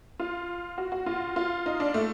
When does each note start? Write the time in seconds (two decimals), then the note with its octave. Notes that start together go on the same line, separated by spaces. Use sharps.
0.20 F4
0.78 F#4
0.92 F#4
1.06 F4
1.36 F4
1.66 D#4
1.80 D4
1.94 A3